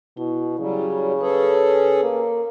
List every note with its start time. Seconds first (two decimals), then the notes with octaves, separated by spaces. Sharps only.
0.17 B2 E4
0.59 C#3 F#3 G3
1.21 C#4 G#4 A4 B4
2.03 A#3